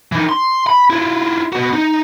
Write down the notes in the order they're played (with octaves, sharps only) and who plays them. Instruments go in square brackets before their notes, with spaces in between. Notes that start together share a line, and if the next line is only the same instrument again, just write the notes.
[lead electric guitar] E3 D#4
C6
B5
E4 F4
B3 F#4
D#4